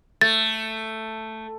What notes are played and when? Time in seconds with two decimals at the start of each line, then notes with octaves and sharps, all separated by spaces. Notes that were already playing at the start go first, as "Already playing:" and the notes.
0.21 A3 A6